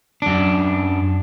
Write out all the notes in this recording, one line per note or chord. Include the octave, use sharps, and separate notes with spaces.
F#2 D4